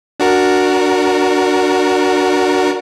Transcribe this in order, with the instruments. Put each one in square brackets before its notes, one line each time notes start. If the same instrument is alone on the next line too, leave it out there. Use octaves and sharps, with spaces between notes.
[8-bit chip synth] D4 F#4 A#4